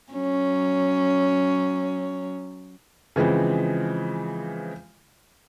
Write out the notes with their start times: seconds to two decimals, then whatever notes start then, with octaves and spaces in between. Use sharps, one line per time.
0.13 F#3 C#4
3.16 C#3 E3 F3 G#3 C4